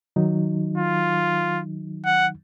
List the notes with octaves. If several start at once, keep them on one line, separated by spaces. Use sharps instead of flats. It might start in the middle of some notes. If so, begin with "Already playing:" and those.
D#3 F#3 D#4
F4
F#5